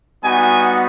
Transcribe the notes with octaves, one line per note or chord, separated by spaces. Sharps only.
G3 B3 D#4 F#4 G#5